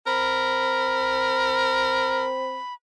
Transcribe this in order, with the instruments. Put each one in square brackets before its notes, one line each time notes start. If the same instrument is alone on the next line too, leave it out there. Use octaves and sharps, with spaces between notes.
[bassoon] C4 [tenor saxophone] A#4 [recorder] B5